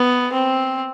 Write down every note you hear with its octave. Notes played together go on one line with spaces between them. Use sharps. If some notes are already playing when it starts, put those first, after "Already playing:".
Already playing: B3
C4